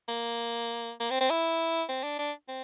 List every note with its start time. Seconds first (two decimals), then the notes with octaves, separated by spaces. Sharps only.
0.09 A#3
1.00 A#3
1.10 C4
1.21 C4
1.30 E4
1.89 C4
2.03 D4
2.19 D4
2.48 C4